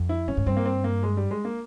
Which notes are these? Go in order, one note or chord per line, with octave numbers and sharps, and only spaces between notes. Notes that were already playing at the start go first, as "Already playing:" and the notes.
Already playing: F2
E4
A#2 C#4
G#2
G2 C4
A#3
C4
A#3
G#3
G3
G#3
A#3